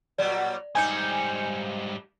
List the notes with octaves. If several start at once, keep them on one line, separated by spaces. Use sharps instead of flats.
A#2 F#3 G3 D5
G#2 G3 C4 D#4 G#5 G6 C#7